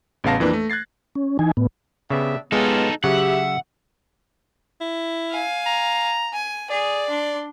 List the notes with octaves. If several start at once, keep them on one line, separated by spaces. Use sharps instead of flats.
A1 C#3 B3 F5 A5 A#6
F2 E3 A#3 D4 B4
A3
F#6 G#6 A6 C7
C#4
E3 D#4 G#5
A2 B3
C#3 B3 D4 G4 E5
G#3 B3 C#4 D#4 F4 G4 A4
C#3 F#3 G4 E5 F#5
E4
F5 G#5
A#5
G#5
G#4 D5
D4 C6